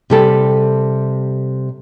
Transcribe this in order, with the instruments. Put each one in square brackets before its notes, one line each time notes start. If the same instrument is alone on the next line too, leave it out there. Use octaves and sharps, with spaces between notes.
[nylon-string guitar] C3 G3 A4